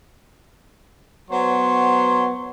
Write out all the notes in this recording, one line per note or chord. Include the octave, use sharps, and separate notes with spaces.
F#3 B3 C5 C#5 C6